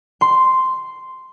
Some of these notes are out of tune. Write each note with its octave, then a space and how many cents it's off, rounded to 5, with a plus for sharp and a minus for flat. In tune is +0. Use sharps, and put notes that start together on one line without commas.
C6 -5